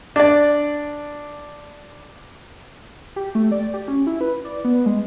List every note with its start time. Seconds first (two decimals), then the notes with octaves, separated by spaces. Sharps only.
0.16 D4 D5
3.16 G4
3.35 A3
3.52 D5
3.74 G4
3.88 C#4
4.07 E4
4.21 B4
4.45 D5
4.65 B3
4.86 G#3